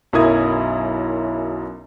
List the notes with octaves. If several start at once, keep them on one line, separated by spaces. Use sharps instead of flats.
B1 F#2 E4 A#4 D#6 G#6